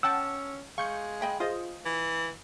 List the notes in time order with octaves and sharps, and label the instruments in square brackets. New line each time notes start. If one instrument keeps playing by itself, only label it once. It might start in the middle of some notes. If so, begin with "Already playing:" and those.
[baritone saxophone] C#4 [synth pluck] F#5 G5 A5 [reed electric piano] E6
[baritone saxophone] G#3 [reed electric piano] F5 [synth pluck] C#6 G6 C#7
[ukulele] D#5 G5 B5
[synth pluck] F4 [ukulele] G#4 C5 D#5
[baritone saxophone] E3